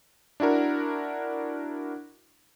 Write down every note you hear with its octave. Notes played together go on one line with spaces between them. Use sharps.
D4 E4 F#4 A#4